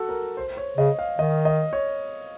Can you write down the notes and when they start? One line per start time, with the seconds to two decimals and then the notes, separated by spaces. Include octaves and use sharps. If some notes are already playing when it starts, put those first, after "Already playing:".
Already playing: F#4 A4
0.09 A#4
0.37 C5
0.57 C#5
0.77 C#3 D#5
0.99 F5
1.18 D#3 D#5
1.45 D#5
1.73 C#5